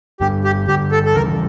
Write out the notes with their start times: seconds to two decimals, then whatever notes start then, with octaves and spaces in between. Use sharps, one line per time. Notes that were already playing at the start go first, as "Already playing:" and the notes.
0.21 G2 D3 G3 G4
0.44 G4
0.68 G2 D3 G3 G4
0.92 A4
1.06 A4
1.15 D#2 C#3 E3 G3 A#4